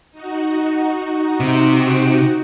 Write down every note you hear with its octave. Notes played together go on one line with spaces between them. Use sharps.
D#4 F#4
C3